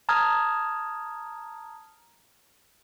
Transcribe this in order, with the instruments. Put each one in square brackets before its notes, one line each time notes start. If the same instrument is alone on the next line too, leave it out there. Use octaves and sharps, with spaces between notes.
[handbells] A5 A#5 D#6 F6 G#6